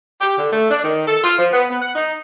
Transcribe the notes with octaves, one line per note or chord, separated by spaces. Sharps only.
G4
D3
A3
D4
D#3
A4
F4
F3
B3
B3
F#5
D#4